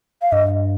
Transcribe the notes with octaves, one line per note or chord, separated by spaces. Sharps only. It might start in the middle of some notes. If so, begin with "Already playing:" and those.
F5
G2 D#5